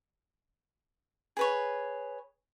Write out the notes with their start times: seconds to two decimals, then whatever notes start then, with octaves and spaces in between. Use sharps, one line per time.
1.37 G#4 B4 C#5